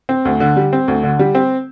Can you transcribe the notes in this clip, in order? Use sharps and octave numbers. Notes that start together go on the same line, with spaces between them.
C4
D2
D3
G3
C4
D2
D3
G3
C4